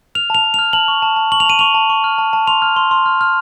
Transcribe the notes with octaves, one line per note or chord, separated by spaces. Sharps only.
F6 F7
A5 F7
A5
F6 F7
A5 F#7
C#6
A5
A5
C#6 F#7
F7
A5 D#7
C#6 F7
A5
C#6
F6
A5
A5
C6 F7
F6
C6
C6
F6
F6